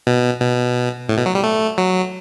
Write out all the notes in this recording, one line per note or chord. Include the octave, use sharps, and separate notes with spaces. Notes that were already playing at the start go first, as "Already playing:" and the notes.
B2
B2
A2
B2
F#3
G3
A3
F#3